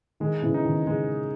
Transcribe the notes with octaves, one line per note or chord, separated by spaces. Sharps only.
D#3 G#3
C#3 E3
D#4
D#3
C#3 G#3